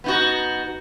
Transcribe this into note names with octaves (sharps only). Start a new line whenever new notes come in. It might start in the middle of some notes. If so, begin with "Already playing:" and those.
B3 D#4 F#4